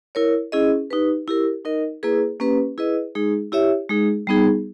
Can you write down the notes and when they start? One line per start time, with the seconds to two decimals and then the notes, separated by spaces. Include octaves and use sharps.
0.15 E4 A#4 C#5
0.52 C#4 E4 G#4 D#5
0.91 D#4 G4 B4
1.28 E4 G4 A#4
1.65 D#4 A#4 D#5
2.03 A#3 E4 G#4 B4
2.40 A#3 C#4 G4 B4
2.78 E4 G#4 B4 D#5
3.15 G#3 D#4 G#4
3.52 E4 G4 C#5 E5
3.90 G#3 D#4 G#4
4.27 G3 B3 D#4 G#4